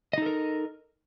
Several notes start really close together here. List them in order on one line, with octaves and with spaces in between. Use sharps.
D#5 D#4 A4 A#4